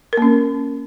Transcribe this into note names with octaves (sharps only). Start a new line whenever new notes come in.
A#3 C#4 A#4